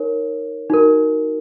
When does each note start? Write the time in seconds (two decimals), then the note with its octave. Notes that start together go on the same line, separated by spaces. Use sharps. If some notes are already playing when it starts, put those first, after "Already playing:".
Already playing: D#4 A#4 C#5
0.70 D#4 F#4 A#4